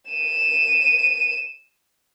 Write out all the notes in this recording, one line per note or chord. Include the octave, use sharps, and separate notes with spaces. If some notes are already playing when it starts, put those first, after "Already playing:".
D#7 E7